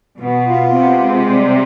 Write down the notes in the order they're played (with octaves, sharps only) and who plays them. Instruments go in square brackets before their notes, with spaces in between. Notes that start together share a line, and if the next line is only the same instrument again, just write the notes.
[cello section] B2 [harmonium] B3
[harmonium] F4
[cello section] C3 [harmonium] B3
[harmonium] G#3
G3